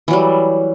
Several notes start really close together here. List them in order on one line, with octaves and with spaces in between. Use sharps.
E3 F#3 G3